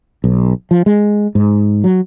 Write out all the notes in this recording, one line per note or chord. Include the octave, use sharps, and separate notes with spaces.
B1
F3
G#3
G#2
F#3